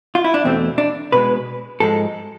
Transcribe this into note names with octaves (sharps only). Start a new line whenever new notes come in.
F4
E4
D4
E2 B2 A3 C4
D4
B2 G#3 B4
G#2 F3 G#3 A4